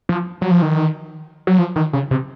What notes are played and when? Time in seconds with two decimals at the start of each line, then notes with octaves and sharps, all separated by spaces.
0.09 F3
0.41 F#3
0.51 F3
0.62 D#3
1.47 F#3
1.59 F3
1.76 D#3
1.93 C#3
2.11 C3